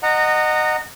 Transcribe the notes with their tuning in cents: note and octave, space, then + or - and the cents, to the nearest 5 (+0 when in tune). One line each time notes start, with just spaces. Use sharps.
D#5 -20 F#5 +0 A#5 -25